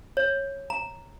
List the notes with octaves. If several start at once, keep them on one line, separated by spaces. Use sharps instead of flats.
C#5
A#5